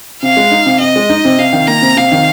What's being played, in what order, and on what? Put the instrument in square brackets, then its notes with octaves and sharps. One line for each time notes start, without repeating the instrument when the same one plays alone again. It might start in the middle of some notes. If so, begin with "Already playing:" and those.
[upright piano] C3 [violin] F5
[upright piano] G#3
D#4
C3
[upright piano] C3 [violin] D#5
[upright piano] G#3
D#4
C3
[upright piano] C3 [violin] F5
[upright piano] D#3
[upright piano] A#3 [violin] A#5
[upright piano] C3
[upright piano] C3 [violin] F5
[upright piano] D#3